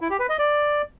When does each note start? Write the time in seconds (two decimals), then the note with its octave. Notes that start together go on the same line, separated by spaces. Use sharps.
0.01 E4
0.10 G4
0.20 B4
0.29 D#5
0.39 D5